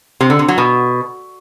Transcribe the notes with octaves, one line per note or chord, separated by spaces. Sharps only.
C3
D3
C3
F#3
B2